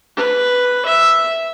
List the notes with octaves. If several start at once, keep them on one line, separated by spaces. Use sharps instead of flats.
B4
E5